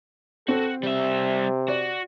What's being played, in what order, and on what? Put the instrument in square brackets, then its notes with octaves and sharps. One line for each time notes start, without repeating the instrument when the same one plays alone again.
[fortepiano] C4 [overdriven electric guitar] F#4 [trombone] A4
[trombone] C3 [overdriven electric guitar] G3 E5
[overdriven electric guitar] F#4 [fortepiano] D5